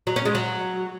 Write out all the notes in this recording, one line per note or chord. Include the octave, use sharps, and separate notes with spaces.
F#3
C#4
G#3
F#3